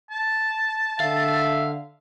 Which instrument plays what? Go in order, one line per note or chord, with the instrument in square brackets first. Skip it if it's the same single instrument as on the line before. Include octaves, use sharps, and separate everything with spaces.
[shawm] A5
[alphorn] D3 [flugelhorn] E5 [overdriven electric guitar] F5